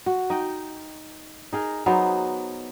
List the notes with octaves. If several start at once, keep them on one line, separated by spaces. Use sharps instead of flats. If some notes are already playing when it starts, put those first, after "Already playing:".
F#4
D#4 D#5 G5
D#4 G#4 A#4
F#3 B3 D#4 C5